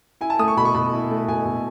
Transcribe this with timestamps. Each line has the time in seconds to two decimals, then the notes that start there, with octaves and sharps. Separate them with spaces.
0.21 E4 G#5
0.30 A5
0.39 A3 D#6
0.48 C#6
0.57 B2 B5
0.65 C#6
0.75 B2 B5
0.93 E4
1.11 A3
1.28 B2 G#5
1.46 B2